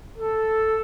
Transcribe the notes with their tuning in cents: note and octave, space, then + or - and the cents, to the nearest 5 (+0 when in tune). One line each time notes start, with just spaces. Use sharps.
A4 +0